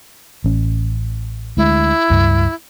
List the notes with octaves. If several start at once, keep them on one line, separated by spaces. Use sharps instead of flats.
A1 C#4
D2 G#3 E4
C#2 G2